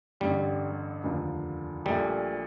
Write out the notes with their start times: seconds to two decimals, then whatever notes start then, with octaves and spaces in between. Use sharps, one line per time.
0.20 A1 G2 D3 G3
1.03 F1 D#2 D3 F3
1.85 A#1 A#2 G3 A3